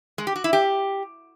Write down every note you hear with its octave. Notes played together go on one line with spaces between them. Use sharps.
G#3
G4
F#4
E4
G4